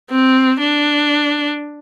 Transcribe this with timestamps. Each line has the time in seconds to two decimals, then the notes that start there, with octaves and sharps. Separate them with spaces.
0.10 C4
0.60 D4